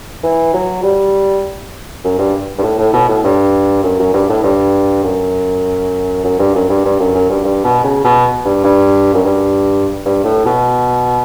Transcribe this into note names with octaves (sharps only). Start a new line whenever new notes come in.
E3
F#3
G3
F#2
G2
G2
A2
A2
B2
A2
G2
F#2
F#2
G2
A2
G2
F#2
F#2
G2
F#2
G2
G2
F#2
F#2
G2
G2
B2
C#3
B2
G2
G2
F#2
G2
G2
A2
B2